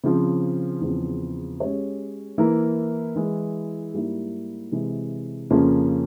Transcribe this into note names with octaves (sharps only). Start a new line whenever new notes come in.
C#3 F3 C4
E2 C#3 F3 C4
G#3 C#4 G4 C#5
E3 A#3 E4 A#4
E3 G#3 E4
G#2 G3 A#3 E4
C3 E3 G#3
F2 C#3 F3 A#3 C#4